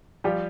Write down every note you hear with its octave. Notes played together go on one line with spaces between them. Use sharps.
F3 G3 G4